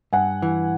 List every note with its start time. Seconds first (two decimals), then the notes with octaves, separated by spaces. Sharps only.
0.13 G2 F#5 G#5
0.42 E3